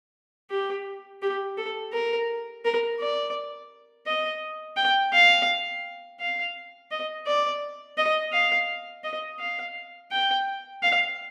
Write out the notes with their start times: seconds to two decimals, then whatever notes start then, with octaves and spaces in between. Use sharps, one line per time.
0.50 G4
1.22 G4
1.58 A4
1.93 A#4
2.65 A#4
3.00 D5
4.07 D#5
4.77 G5
5.13 F5
6.20 F5
6.91 D#5
7.27 D5
7.98 D#5
8.33 F5
9.04 D#5
9.40 F5
10.12 G5
10.83 F5